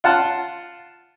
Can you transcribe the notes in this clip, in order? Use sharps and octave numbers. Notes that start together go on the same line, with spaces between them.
F4 F#5 A5 C6